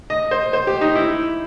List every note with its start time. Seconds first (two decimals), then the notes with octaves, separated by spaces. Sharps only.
0.10 D#5
0.31 C5
0.53 C5
0.67 G4
0.81 D#4
0.95 E4